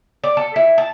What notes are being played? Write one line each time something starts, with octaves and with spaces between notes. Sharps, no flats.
D5
A4
E4
A5